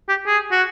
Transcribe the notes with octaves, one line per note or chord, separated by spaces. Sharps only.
G4
G#4
F#4